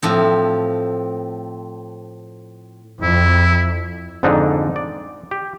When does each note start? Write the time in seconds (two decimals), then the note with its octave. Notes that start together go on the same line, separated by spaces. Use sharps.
0.03 A2 F3 C4
3.01 F2 E4
4.23 F2 G#2 D3 D4 D#4
4.76 D5
5.31 G4